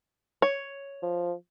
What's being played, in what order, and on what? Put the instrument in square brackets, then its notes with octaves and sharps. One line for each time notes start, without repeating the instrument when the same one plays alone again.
[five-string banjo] C#5
[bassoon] F3